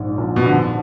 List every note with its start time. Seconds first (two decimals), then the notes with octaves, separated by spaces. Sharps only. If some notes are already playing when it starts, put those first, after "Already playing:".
Already playing: A#1 G#2
0.18 A#1
0.36 B2
0.46 F2 D3